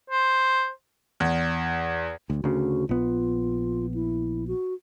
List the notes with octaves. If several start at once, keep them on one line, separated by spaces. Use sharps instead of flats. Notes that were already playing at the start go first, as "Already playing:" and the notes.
C5
E2
D2
D2 C#3 F#4
A#1 B3 F4
E4
F#4